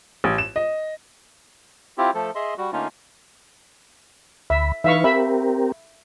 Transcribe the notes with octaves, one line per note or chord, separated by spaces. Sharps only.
A1
E7
D#5
C4 E4 F4 G4
F3 A3 A4
G#4 D#5 E5 C6
G3 F#4
D3 A3 A#3 C#4 D#4 F4
D2 E5 B5
E3 D#4 B4 E5 F5 C#6
C4 G4 A#4 E5 B5